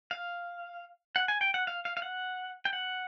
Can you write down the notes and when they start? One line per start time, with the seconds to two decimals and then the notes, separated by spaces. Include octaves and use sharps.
0.11 F5
1.16 F#5
1.28 G#5
1.41 G5
1.54 F#5
1.67 F5
1.85 F5
1.97 F5
2.02 F#5
2.65 G5
2.73 F#5